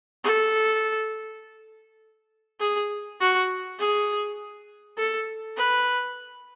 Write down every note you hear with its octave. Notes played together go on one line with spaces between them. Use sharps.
A4
G#4
F#4
G#4
A4
B4